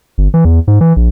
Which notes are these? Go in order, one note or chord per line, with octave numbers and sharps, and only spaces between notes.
G1
E3
E2
G#2
E3
A#1